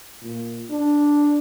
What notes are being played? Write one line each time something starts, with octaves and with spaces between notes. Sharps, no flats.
A#2
D4